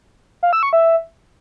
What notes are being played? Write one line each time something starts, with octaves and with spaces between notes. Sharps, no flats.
F5
E6
C#6
E5